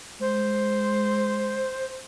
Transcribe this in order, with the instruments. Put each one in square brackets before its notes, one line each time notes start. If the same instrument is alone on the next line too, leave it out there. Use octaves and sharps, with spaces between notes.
[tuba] G#3 [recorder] C5